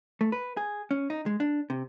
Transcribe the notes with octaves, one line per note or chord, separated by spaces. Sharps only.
A3
B4
G#4
C#4
D#4
G#3
D4
C3